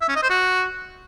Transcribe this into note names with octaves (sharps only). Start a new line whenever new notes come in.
E5
C#4
D#5
C5
F#4